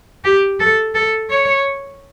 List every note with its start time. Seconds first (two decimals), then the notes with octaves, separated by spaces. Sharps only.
0.24 G4
0.60 A4
0.95 A4
1.30 C#5